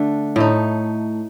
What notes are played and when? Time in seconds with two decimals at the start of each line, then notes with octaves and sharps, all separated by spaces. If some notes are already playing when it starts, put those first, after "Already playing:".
Already playing: D3 A3 D4
0.36 A2 A3 D#4